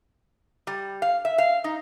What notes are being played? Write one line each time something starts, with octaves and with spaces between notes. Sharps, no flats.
G3
F5
E5
F5
D#4